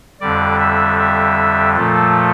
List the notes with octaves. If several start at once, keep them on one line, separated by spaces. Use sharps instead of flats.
F2 D3 G3 D5
E5
E5
A#2 F3 A3 A4